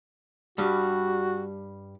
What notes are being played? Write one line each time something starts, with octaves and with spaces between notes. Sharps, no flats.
G2 G3 F#4